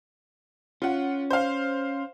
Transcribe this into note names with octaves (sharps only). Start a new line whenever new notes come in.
C#4 F4 F#5
C5 F5